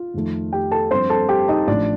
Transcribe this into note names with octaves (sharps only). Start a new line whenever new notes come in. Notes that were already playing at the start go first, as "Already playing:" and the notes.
Already playing: F4
F2 D#3 A3
G4 G5
A4 A5
G2 F3 C4 C5 C6
A4 A5
G4 G5
D#4 D#5
A1 A2 F3 D4 D5